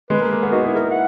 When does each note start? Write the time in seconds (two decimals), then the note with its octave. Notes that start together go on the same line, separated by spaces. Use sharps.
0.10 G#3 B4
0.20 A#3
0.32 A#3
0.43 B3
0.51 D#4 F#4
0.63 E4 G#4
0.74 A#4
0.91 F#5